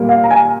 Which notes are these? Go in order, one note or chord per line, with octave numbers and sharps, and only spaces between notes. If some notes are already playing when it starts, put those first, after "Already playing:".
Already playing: A#2 G3 A#3
F5
A#5
G#5